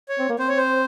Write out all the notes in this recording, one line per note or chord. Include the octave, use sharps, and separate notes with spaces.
C#5
C4
A#3
C4 C5
C#5
C5